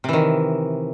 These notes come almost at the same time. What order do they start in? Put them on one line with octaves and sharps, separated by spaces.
C3 E3 D#3